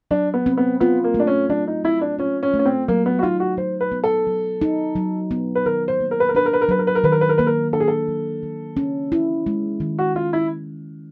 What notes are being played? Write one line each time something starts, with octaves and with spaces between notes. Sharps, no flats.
F#3 D4
B3
C4
B3
B3 F4
A#3
A3
D4
C#4
F#3 D4
D#4
C4 E4
D4
C#4 F4
C#4
A3
C#4
C4
F#3 A#3
B3
F#4
D#4 F4
F#4
F#3 C5
B4
B3
A4
F#3
D#4
F#3
B3
B4
D#3 A#4
C5
A#3
A#4
B4
A#4
D4 B4
A#4
B4
A#4
F#3 B4
A#4
B4
A#4
D#3 B4
A#4
B4
A#4
A#3 B4
A#4
D4 A4
G#4
A4
F#3
D#3
C#4
E4
G#3
D#3
F#4
C#4 F4
E4